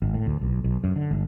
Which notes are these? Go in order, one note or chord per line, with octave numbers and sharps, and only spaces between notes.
G#1
A2
D2
B1
B1
F#2
D3
G1